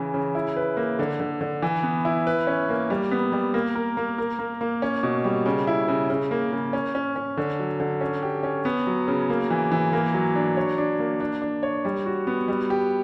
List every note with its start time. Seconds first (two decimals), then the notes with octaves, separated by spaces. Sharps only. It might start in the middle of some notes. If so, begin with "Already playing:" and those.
Already playing: C#3 E3
0.14 C#3
0.35 E4
0.57 B4
0.77 A#3
0.99 D3
1.20 D3
1.41 D3
1.62 E3
1.83 B3
2.05 E4
2.27 B4
2.47 C#4
2.69 A#3
2.90 G3
3.11 B3
3.32 G3
3.54 A#3
3.75 A#4
3.97 A#3
4.18 A#4
4.39 A#3
4.61 A#3
4.82 C#4
5.03 B2
5.24 G3
5.46 C#3
5.67 E4
5.88 C#3
6.10 C#3
6.31 A#3
6.52 C#3
6.73 C#4
6.95 C#4
7.16 C#4
7.37 D3
7.59 F#3
7.80 D3
8.01 C#4
8.23 G4
8.43 C#4
8.65 B3
8.87 F#3
9.08 C#3
9.30 A#3
9.50 E3
9.72 E3
9.93 A#3
10.14 F#3
10.35 D4
10.57 C#5
10.78 D4
11.00 A#3
11.20 D4
11.42 D4
11.63 C#5
11.85 G3
12.06 F#4
12.27 B3
12.48 G3
12.70 G4